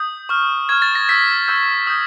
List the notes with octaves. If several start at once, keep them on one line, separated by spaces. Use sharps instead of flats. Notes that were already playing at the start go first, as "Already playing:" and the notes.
Already playing: D#6 G6
C#6 F6
C#6 F6 G#6
A6
A#6
C#6 E6 G6 B6
C#6 E6 G6
D#6 G6